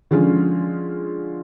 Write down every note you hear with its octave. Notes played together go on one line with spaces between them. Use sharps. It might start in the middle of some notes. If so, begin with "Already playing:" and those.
D3 F3 G#3 C#4 F4